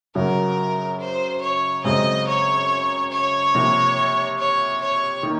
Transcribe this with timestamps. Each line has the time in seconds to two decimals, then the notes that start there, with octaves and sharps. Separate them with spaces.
0.15 F#2 C#3 F#3 A#4
1.00 C5
1.41 C#5
1.84 F#2 C#3 G#3 C4 D#5
2.27 C#5
3.11 C#5
3.54 C3 F3 A#3
4.39 C#5
4.81 C#5
5.23 D#3 A#3